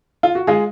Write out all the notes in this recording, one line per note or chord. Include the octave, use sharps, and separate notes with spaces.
F4
F#4
G#3 F4 G#4